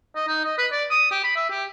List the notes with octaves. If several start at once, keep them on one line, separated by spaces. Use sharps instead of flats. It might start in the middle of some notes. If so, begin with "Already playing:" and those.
D#5
D#4
D#5
B4
D5
D#6
G4
B5
E5
G4